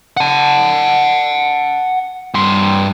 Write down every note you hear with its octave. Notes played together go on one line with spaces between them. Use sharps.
F#5 A5
G2 C6